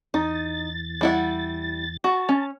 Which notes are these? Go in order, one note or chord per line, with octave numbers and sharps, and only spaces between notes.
E2 D#4 A6
G3 E4 F#5
F#4 A5
C#4